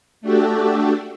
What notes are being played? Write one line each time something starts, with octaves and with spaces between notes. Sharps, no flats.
A3 D4 F#4 G4 A4